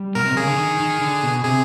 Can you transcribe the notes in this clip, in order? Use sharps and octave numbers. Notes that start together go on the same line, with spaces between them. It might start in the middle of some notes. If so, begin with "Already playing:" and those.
Already playing: G3
B2 A#4
C3
C#3 G#4
D3
D#3
D#3
D3
B2
C3 G#4